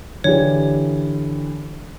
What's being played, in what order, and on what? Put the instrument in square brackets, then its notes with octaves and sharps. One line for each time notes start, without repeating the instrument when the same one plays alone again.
[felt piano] D3 E3 G4 [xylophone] C#5